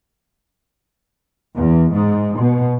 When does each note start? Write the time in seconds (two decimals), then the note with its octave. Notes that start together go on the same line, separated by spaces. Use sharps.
1.55 E2
1.92 G#2
2.39 B2